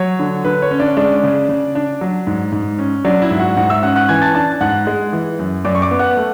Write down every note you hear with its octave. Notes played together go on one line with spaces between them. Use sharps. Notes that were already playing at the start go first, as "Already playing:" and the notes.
Already playing: F#3 C#5
D3
D3 B4
C#5
C#4
D4 D5
G#3 D4 D5
C#3
C#3
D4
F#3
G#2
G#2
C#4
F#3 D4 D5
E4 E5
G#2
F#4 F#5
G#2 F#4 F#5
E5 E6
C#4 F#5 F#6
F#5 F#6
E3 G#5 G#6
A5 A6
D4 A5 A6
G#2 F#5 F#6
G#3
E3
F#2
F#2 D5 D6
C#6
D5 D6
B3
F#5 F#6
A3